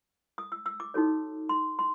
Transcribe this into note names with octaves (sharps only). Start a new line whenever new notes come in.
D#6
E6
E6
D6
D#4 F#4 A4 C#5
C6
C6